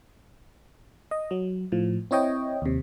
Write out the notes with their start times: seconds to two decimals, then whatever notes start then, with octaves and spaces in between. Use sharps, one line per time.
1.11 D#5
1.31 F#3
1.72 A2 F3
2.11 C4 E4 C#5 D#5 G5
2.62 D#2 C3